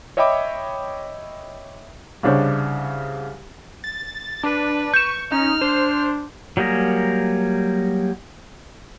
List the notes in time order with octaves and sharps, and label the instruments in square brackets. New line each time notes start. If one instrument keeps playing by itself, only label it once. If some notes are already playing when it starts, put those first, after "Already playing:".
[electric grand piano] C#5 D#5 E5 G5 B5 D6
[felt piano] C2 C#3 D4 C5 C#5
[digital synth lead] A6
[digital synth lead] D4 [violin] B4
[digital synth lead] C#6 [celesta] G6 E7
[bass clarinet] C#4 [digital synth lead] D#4 [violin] F6
[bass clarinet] D4 [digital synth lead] C5
[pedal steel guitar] F#3 G3 A#3 G#4 A#4